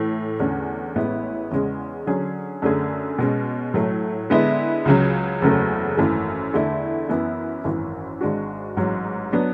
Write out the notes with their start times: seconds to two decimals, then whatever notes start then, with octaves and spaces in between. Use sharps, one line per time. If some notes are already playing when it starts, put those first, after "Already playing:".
Already playing: A2 E3 A3
0.40 E2 D3 A3 C#4
0.95 A1 A2 G#3 B3 E4
1.51 E2 C#3 G#3 C#4
2.07 D3 F#3 C#4 G#4
2.62 F#2 D3 A3 C#4 G#4
3.18 B2 G#3 C#4
3.74 A2 F#3 A3
4.30 D3 G#3 B3 E4
4.85 C#2 C#3 F#3
5.42 F#1 E2 C#3 F#3 A3
5.97 G#1 F#2 E3 A3
6.54 E2 D3 A3 E4
7.09 F#2 E3 B3 E4
7.65 G#1 F#2 E3
8.21 G#1 G#2 G#3 D4 F#4
8.77 A1 G#2 F#3
9.33 F#3 B3 D4